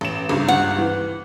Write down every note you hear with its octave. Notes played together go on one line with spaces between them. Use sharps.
A1 E7
G#1 C#2 G2
F#5
E3